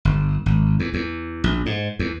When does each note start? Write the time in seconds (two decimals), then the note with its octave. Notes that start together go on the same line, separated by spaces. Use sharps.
0.05 G1
0.46 G#1
0.80 E2
0.94 E2
1.44 A#1
1.66 G#2
1.99 E2